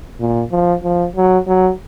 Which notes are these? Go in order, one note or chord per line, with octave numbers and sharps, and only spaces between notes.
A#2
F3
F3
F#3
F#3